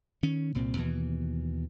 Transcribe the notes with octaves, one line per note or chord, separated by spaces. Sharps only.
D#3 C#4
C2 A#2 C4
D#2 B2 E3